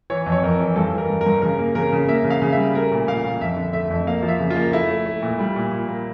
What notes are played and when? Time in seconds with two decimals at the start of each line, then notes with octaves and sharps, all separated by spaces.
0.10 E3 C#5
0.26 F2
0.32 C#5
0.43 F2 A#4
0.60 E3
0.76 G2 A4
0.93 E3 A#4
1.10 G2
1.21 A#4
1.26 G2
1.42 C#3 A#4
1.59 A#3
1.75 C#3 A#4
1.93 C#3
2.08 A#3 E5
2.24 C#3
2.30 F5
2.42 C#3
2.52 E5
2.57 G3
2.74 A3 A#4
2.92 A#2
3.08 A#2 F5
3.24 A#2
3.41 F2 E5
3.57 D3
3.73 A3 E5
3.90 F2
4.07 A#3 F5
4.23 F3
4.28 E5
4.40 C#3
4.50 F4
4.57 A#3
4.72 A3 E4
4.90 A3
5.06 A3
5.22 A#2
5.39 G3
5.56 A#2
5.71 A#2
5.88 A#3